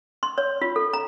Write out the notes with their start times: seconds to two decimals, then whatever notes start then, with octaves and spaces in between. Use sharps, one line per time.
0.23 C6
0.38 C#5
0.62 F4
0.76 A4
0.93 A#5